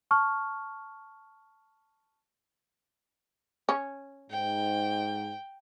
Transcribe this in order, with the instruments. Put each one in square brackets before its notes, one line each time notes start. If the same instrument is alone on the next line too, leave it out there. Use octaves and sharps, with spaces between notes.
[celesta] A5 C#6 F6
[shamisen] C#4
[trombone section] G#2 [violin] G5